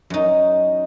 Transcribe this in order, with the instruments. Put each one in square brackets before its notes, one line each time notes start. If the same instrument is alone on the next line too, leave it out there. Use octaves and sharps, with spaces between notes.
[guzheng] F#2 D#4